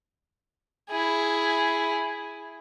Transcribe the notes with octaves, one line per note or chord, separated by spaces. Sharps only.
E4 G#4